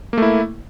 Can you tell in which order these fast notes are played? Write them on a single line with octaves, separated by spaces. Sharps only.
A#3 A3 E4